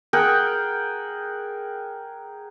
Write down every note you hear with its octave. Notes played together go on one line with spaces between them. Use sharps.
G#4 A#4 F#5 G5